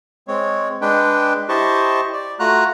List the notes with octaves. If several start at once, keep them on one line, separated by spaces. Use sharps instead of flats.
G#3 C4 C#5
G#3 D4 B4 G5
E4 G4 C5 D#5 A5 C#6
D5
A3 F4 F#4 A#5 F#6